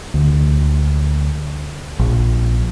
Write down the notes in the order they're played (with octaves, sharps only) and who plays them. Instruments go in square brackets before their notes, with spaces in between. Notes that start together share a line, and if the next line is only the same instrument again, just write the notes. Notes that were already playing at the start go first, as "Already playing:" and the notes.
[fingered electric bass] D2
A#1